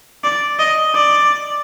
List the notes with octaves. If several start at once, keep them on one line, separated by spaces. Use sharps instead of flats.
D5
D#5
D5